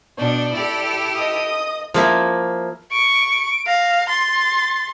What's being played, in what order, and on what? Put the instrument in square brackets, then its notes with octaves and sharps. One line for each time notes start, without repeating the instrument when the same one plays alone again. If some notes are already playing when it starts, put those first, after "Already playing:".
[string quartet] B2 D4 G6 [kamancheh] D5
[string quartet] E4 G4 A4
[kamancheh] D#5 D#6
[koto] F3 A#3 E4
[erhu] C#6 [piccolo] D7
[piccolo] D7
[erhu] F5 [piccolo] A#6
[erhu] C6 [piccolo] A6